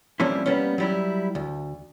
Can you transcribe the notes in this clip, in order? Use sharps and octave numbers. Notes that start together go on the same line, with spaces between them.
F3 G3 A#3 C4 C#4 E4
G3 A#3 B3 C#4
F#3 G3 E4
D2